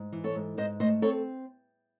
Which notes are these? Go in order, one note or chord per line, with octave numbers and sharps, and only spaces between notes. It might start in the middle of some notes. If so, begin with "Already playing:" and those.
Already playing: G#2
E3
A4 C#5
G#2
G#2 C5 D#5
A3 C5 D#5
C4 A4 C#5